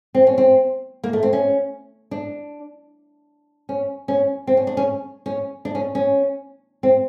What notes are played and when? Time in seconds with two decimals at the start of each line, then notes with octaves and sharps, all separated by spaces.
0.15 C4
0.27 C#4
0.38 C4
1.04 A#3
1.13 A3
1.23 C4
1.33 C#4
2.11 D4
3.69 C#4
4.08 C#4
4.47 C4
4.57 C#4
4.67 D4
4.77 C#4
5.26 C#4
5.65 D4
5.75 C#4
5.95 C#4
6.83 C4